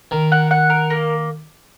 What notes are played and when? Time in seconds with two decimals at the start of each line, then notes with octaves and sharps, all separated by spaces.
0.11 D#3 A#4
0.32 F#5
0.51 F#5
0.70 A#4
0.90 A#3